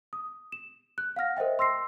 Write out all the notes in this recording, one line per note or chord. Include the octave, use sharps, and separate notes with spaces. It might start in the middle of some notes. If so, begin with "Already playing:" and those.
D#6
E7
F#6
F5 F#5 F6 A#6
A#4 C5 D#5 E5 G5
C6 E6 A#6 C7